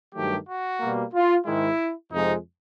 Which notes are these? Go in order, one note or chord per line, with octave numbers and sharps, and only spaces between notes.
G2 D#3 F#3 A3 G4
F#4
B2 G3 A#3
F4
G#2 D#3 G#3 E4
F2 C3 F3 G#3 D#4